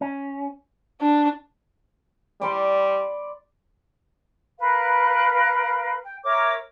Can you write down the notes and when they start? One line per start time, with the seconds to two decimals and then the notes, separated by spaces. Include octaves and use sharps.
0.01 C#4
1.01 D4
2.42 G3 D5 B5 C6
4.58 A#4 B4 F5
6.02 G5
6.24 A#4 C#5 E5 D6